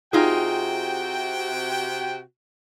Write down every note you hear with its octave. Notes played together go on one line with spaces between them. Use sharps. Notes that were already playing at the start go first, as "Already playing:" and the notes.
C3 D#4 F4 F#4 G#4 G5